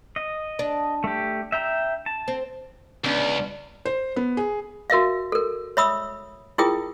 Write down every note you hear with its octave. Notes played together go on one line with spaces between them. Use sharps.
D#5
D4
A3 G4
E5 G5 A#5
A5
C4
C#2 B3 C#4 D4
C5
B3
G#4
F#4 A#4 E5 F5
A4 A#4
C#5 E5 B5 D#6 E6
E4 F4 G#4 A#4 G5 D#6